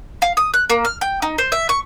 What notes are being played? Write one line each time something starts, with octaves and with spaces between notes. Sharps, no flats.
F5
D#6
F#6
A#3
F6
G5
D#4
C5
E5
C#6